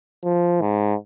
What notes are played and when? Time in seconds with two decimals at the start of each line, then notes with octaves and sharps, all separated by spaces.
0.23 F3
0.61 G#2